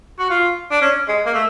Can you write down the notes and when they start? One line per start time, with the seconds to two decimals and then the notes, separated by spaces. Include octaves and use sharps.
0.19 F#4
0.30 F4
0.71 D4
0.82 C#4
1.08 G#3
1.26 A#3
1.34 A3